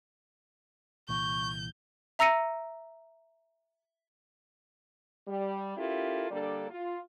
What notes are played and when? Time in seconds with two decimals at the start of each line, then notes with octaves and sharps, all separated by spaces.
1.09 C2 A#2 E3 C#6 G6
2.19 E5 A#5 E6 A#6 C#7 D#7
5.28 G3
5.77 C#4 E4 F4 G4 A4 A#4
6.31 D3 G3 A#3 D4 A4 D5
6.70 F4